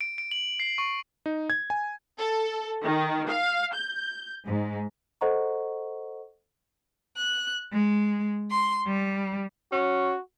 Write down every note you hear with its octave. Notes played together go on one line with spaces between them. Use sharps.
D7
D7
F#7
C7
C#6
D#4
G#6
G#5
A4
D#3
F5
G6
G#2
A4 C5 D#5 F#5 A#5 C#6
F#6
G#3
C6
G3
C#4 F#4